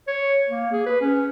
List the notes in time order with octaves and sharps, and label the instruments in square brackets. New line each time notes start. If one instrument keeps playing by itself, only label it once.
[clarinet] C#5
A#3
G#4
B4
C#4